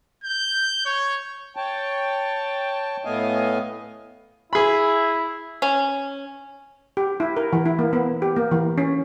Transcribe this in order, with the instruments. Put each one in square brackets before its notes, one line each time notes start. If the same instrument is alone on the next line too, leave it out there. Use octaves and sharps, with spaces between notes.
[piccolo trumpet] G6
C#5
[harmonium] C#5 G5 A5
A2 A3 B3 D#5 F5 G#5
[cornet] E4 [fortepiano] G#4 B5
[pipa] C#4
[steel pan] G4
E4
A#4
E3
E4
A#3
B3
G4
A#3
E3
C#4